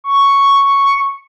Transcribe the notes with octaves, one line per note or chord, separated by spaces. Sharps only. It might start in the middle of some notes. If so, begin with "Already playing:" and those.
C#6